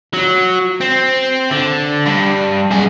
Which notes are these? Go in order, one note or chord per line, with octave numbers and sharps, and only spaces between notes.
F#3
C4
D3
G2
F#2 G#4